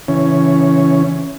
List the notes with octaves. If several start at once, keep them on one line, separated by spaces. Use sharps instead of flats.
C#3 E3 C#4